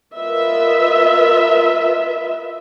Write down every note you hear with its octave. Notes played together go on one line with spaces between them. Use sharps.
F4 A#4 B4 D#5 E5